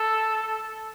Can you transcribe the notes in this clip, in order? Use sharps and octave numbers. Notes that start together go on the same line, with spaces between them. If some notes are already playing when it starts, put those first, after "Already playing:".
Already playing: A4